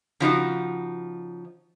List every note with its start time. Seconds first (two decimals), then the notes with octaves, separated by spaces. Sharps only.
0.20 C#3 F3 D#4 F#4